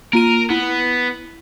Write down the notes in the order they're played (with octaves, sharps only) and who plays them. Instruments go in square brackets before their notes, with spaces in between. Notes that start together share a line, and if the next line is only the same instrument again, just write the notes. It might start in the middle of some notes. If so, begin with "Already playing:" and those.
[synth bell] A#3 F4 D#7 [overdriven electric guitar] A#4
[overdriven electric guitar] B3 [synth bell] E4